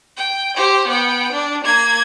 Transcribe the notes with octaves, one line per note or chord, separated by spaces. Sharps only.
G5
G4 C5
B3 G5
D4
A#3 G#6